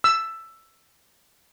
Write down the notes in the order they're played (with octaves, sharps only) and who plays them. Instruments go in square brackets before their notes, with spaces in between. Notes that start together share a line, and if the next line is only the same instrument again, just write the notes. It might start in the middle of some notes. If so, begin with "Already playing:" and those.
[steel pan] E6